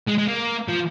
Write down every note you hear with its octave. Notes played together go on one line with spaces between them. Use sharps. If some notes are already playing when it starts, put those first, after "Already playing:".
G#3
G#3
A#3
F3